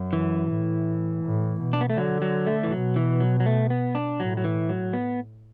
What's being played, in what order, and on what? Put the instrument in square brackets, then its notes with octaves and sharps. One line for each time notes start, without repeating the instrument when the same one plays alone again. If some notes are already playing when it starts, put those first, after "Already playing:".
Already playing: [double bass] F#2
[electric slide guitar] E3
[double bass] A2
A2
B2
[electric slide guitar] D4
B3
A3
[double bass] D3 [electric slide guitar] F#3
[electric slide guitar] F#3
A3
E3
[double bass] B2 [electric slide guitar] F#3
[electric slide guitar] E3
F#3
F#3
A3
B3
D4
[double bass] A2 [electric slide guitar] F#3
[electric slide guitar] F#3
E3
F#3
B3